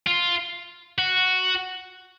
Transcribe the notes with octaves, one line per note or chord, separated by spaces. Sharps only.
F4
F#4